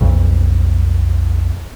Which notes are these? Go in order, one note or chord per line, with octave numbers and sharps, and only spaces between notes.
B1 F2